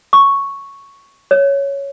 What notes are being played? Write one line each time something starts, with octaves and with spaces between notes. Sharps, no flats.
C#6
C#5